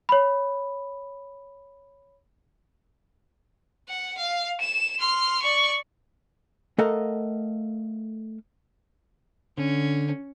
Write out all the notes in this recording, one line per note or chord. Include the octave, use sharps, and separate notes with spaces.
C#5 B5
F#5
F5
E7
C6 F6
D5 C#6
A3 A4 A#4 D#5 F5 F#5
D3 C#4